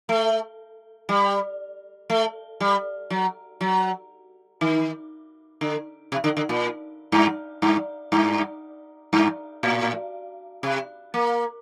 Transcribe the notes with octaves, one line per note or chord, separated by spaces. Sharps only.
A3
G3
A3
G3
F#3
F#3
D#3
D3
C3
D3
D3
A#2
G2
G2
G2
G2
A2
C3
A#3